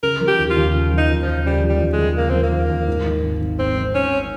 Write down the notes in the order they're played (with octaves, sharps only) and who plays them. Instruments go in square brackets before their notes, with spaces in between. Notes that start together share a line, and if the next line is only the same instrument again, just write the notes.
[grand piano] C#3 [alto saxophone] A#4
[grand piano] F3
[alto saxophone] G4
[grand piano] D#2
[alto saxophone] F4
[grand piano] D#2
C#3
F3
[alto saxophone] D#4
[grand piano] D#2
[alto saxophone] F3
[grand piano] D#2
[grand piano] C#3 [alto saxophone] G3
[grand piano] F3
[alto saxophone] G3
[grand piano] D#2
[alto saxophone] G#3
[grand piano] D#2
[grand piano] C#3 [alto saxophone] A#3
[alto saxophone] C4
[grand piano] F3
[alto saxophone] A#3
[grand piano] D#2
D#2
G#2
D#3
G#1
G#1
[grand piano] G#2 [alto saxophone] C4
[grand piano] D#3
[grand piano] G#1 [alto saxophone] C#4